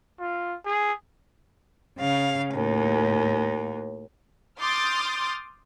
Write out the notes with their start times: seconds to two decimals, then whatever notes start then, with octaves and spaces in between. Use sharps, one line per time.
0.19 F4
0.66 G#4
1.98 C#3 F5
2.53 D#2 A2
4.61 C6 D6 D#6 F6 G6 A6